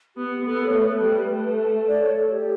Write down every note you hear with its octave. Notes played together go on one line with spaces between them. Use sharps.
B3 G4
B3 A4
C#5
A3 B4
G3
A3
D5
C#5
A4
G4